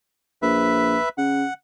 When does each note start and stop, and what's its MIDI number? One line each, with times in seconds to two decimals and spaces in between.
0.42 0.96 34
0.42 1.09 71
0.42 1.09 76
1.18 1.45 49
1.18 1.53 78